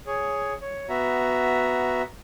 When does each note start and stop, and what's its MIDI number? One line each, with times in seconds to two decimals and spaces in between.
0.07 0.53 68
0.07 0.53 73
0.62 0.87 73
0.89 2.02 59
0.89 2.02 66
0.89 2.02 76
0.89 2.02 82